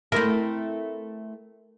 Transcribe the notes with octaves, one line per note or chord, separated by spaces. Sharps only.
A3 C4 E4 A#4